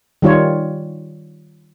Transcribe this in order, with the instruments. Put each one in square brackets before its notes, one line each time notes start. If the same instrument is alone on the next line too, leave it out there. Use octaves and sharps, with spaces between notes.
[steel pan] D#3 G3 F4 C#5